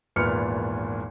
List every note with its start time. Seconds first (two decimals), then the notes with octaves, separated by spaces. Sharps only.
0.16 G#1 E2 A#2 B4 F6 C#7